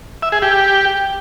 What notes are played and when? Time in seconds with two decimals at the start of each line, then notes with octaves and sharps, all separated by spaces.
0.22 E5
0.32 G#4
0.42 G4